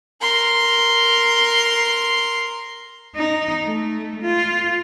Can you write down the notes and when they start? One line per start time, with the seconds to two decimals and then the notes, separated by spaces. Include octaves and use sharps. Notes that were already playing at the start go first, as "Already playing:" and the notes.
0.22 A#4 C6
3.15 D#4
3.65 A3
4.22 F4